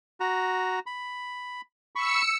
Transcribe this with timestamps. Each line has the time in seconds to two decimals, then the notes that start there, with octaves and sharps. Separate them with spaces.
0.20 F#4 A#5
0.86 B5
1.96 B5 C#6 E6 C#7